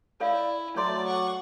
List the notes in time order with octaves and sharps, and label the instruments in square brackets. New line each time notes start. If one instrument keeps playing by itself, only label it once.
[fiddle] E4 [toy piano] A4 C#5 F5 [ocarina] D5
[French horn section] F#3 A3 [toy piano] C#5 A#5 C6 [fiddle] D5 A5 [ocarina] D6
[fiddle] F#5 C#6